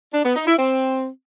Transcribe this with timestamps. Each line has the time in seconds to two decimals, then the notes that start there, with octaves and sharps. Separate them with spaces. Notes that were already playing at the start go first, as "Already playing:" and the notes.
0.14 D4
0.25 B3
0.36 D#4
0.47 E4
0.59 C4